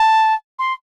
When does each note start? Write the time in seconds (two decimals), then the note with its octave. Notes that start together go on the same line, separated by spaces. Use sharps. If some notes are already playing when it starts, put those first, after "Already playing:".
Already playing: A5
0.59 C6